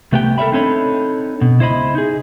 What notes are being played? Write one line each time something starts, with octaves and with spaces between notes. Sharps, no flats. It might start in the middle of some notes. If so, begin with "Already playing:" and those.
C2 A3 B3 G4 G5
A4 A#4 C#5 E5 B5
C4 D4 D#4 A4 C#5 B5
B2
C#2 E4 C5 D#5 B5
D#4 G#4